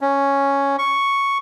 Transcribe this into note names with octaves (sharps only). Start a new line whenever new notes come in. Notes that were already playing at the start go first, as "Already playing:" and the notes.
C#4
C#6